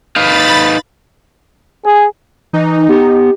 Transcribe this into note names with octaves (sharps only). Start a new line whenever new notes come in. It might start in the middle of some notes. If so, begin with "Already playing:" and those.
D#4 B4 F5 B5 A6
G#4
E3 D#4
B3 G4